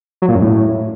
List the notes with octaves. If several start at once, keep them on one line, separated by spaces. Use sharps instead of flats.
F#3
A#2
F#2
A2